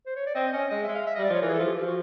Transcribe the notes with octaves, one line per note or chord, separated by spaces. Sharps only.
C5
C#5
D5
C4 D#5
C#4 D#5
G#3 D#5
E5
G#3
F5
E5
D#5
G3
D5
F3
C#5
E3 A#4
G#4
A4
F3
G4
F3 G4
F#4